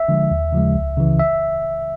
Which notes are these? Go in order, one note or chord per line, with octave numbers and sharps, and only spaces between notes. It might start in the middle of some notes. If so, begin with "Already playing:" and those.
Already playing: E5
D3 F3 G#3
D#2
C#3 F3 G#3
C#2
C#3 E3
E5